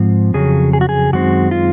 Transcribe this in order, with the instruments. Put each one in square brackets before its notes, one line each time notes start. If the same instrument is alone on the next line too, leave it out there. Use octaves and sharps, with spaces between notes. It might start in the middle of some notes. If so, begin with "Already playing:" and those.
Already playing: [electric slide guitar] G#2 F3 C4
F2 C#3 F#3 G#4
G#4
F#4
G#4
F#2 D#3 G#3 C4 F#4
F4